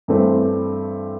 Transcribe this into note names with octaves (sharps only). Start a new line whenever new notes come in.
G2 E3 A3 C4